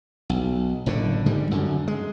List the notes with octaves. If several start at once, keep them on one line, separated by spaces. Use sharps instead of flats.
B1
F#1 A2 D3
G#2 D3 G3
F#2 D3
G#3